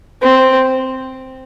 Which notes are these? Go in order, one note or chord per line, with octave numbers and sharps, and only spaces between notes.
C4